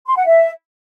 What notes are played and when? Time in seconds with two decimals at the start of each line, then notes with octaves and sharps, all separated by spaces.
0.07 C6
0.16 F#5
0.26 E5